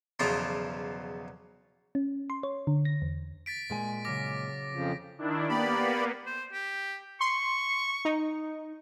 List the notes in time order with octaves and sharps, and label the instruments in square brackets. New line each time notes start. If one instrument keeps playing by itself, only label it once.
[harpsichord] B1 E2 C#3 F3 F4 D6
[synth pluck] C#4
C6
C#5
D3
A#6
E2
[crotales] A6 B6 D7
[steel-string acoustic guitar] A#2 G#3 G#5
[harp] C#3 F#3 F6 [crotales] D6 A#6
[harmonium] F2 C#3 F3
[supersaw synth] D#3 D4 E4
[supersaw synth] A#3 B3 [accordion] G4 D5 B5
[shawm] C5
G4
[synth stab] C6 [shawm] C#6
[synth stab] D#4